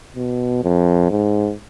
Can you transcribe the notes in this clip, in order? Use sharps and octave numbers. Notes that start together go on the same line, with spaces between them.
B2
F2
G#2